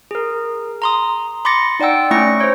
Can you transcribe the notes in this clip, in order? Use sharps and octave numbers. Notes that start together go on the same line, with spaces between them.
G#4 A#4
A#5 C6 D#6
B5 C6 D6 A6 A#6 C#7
D#4 D5 F#5 G5 E6
A3 C#4 E4 C#6 A#6 C#7
C5 C#5